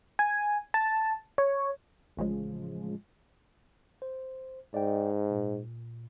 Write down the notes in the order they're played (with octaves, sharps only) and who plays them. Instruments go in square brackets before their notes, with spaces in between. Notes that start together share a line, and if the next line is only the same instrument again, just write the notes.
[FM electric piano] G#5
A5
C#5
[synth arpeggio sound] A1 C#3 F3 G#3
[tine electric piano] C5
[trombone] G#2 [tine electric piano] D5 D#5 G5
[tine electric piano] A#2